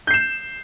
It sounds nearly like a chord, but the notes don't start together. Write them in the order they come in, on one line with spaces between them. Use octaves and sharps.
G6 C7 E7